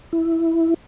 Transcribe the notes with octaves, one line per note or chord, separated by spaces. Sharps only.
E4